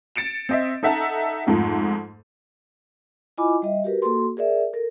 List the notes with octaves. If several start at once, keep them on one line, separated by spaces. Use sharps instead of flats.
A6 C#7 D7 E7
C4 D#5 E5
D#4 A4 E5 F#5 A5 A#5
F2 G#2 F3 A3
E4 F4 D#5 G#5 B5 D6
G3 D#5 E5
F#4 G4 A#4 B4
A#3 F#4 A4 C6
G#4 A#4 D5 E5
A4 A#4